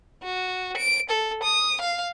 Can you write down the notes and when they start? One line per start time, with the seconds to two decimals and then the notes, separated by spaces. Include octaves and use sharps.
0.23 F#4
0.77 D7
1.10 A4
1.43 D#6
1.81 F5